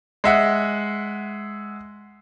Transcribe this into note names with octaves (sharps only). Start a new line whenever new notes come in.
G#3 E5 F#5